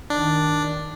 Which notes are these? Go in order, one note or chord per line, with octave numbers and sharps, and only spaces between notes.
D#3 D4